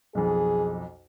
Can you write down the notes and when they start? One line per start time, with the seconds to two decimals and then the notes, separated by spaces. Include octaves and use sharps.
0.15 B1 F2 G#4